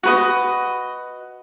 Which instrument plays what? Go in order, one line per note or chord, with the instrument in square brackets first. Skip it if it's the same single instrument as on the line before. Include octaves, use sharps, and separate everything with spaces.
[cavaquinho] F#4 B4 D#5